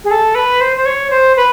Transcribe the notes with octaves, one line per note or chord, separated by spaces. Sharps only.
G#4
A4
B4
C5
C5
C#5
C5
B4